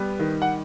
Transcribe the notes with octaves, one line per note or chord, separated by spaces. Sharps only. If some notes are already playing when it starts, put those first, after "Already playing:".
Already playing: G3 B3
D#3
F#5